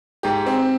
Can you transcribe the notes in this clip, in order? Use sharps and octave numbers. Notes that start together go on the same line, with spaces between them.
G#2 G4
C4